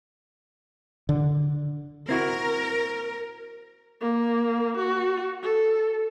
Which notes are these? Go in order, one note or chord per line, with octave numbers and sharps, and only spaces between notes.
D3
C4 E4 F#4 A#4
A#3
F#4
A4